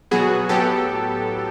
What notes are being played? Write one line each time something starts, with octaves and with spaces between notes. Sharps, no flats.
B2 F#3 B3 F#4 G#4
A2 F#3 B3 G4 A4